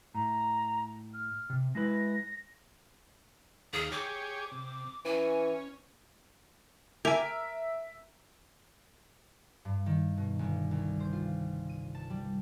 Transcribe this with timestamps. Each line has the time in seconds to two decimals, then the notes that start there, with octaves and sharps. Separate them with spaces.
0.15 A2 A#5
1.14 F6
1.50 C3
1.75 G#3 E4 B4 A#6
3.73 D#2 G#4 F5
3.92 G4 G#4 C#5 D6
4.52 C3
5.05 E3 C#4 G#5
7.05 G4 A#4 E5 G#5 D7
9.65 G2
9.86 D#3
10.17 B2
10.39 G1
10.71 C2
11.00 C5
11.13 F4
11.69 D#7
11.95 A5
12.10 G3